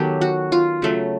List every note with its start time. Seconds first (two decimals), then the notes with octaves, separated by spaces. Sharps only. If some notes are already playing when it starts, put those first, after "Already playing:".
Already playing: D#3 F#3 B3 G4 A4
0.21 F#4
0.52 F4
0.82 C#3 F#3 A3